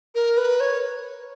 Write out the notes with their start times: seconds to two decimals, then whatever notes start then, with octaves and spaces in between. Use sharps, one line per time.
0.15 A#4
0.37 B4
0.60 C#5